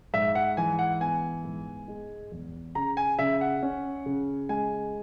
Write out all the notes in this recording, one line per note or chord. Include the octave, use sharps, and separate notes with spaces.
G#2 E5
F#5
E3 G#5
F#5
B3 G#5
G#2
G#3
E2
C#3 A#5
G#5
C#3 E5
F#5
C#4
C#3
G#3 G#5